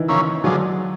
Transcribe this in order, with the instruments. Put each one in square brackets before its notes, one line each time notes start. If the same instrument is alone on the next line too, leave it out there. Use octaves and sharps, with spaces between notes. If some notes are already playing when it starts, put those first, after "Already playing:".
Already playing: [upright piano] D#3 E3
[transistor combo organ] C#3 F3 A#3 C#4 E4
[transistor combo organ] D3 F3 G#3 [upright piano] F#3